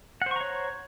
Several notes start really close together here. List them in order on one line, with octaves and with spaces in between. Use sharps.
F#5 C5 C#6 A#5 C#5